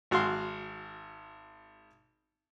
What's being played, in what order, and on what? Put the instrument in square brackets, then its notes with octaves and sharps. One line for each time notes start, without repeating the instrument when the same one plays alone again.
[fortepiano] G#1 F#4 F5 C6